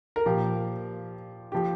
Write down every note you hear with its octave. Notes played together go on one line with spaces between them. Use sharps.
A#4
A#2 F3 G4
F3 G4